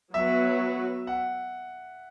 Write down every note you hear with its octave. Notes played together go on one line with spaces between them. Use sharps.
F#3 B3 F#4 B4 E5
F#5